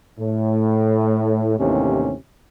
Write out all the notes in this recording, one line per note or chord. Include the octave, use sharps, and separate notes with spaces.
A2
D#2 A2 C3 E3 C#4